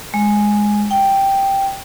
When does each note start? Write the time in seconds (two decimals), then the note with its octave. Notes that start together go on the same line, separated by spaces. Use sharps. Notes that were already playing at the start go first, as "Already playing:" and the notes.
0.14 G#3
0.91 G5